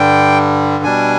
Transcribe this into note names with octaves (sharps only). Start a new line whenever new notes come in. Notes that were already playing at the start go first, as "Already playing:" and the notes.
Already playing: G2 D3 G3 G5
B2 G3 D4 G#5